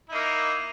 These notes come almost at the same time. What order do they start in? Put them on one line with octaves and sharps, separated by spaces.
E4 D#4 A#3